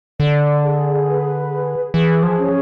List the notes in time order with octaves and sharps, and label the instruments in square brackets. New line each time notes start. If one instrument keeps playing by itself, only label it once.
[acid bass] D3 [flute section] D5
[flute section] G#4
B4
G#4
[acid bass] E3 [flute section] G#4
[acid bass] F3
[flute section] C#4